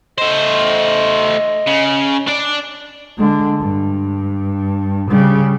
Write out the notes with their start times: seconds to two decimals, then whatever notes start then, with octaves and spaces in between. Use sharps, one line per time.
0.18 A3 C5 D#5
1.67 C#3
2.27 D4 D5
3.18 D3 G#3
3.60 G2
5.10 C#3 G3